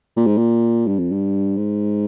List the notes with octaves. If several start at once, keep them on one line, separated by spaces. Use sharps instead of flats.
A#2
G#2
A#2
G2
F2
G2
G#2